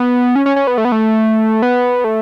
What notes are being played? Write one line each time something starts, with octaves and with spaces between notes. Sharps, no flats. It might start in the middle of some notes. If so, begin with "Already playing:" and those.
Already playing: B3
C#4
C#4
C#4
B3
A3
B3
A3
B3
A3